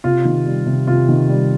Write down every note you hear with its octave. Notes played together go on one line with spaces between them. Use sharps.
C3 F4
D#3
G3
C3
C3 F4
D#3
G3